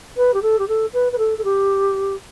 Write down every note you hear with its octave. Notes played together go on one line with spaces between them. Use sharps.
B4
G4
A4
G4
A4
B4
B4
A4
A4
G4